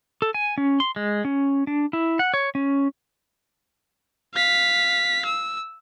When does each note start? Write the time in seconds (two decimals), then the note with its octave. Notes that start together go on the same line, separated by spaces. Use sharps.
0.22 A4
0.34 G#5
0.58 C#4
0.80 C6
0.96 G#3
1.25 C#4
1.67 D4
1.93 E4
2.19 F#5
2.34 C#5
2.55 C#4
4.34 F5 B6
5.25 E6